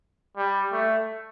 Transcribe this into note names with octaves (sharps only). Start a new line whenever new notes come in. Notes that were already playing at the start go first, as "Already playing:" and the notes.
G3
A3